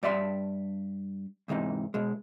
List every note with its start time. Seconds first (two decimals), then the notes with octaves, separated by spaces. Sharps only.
0.03 G2 D5 E5 C6
1.48 E2 G#2 C3 E3 D#4
1.94 B2 G#3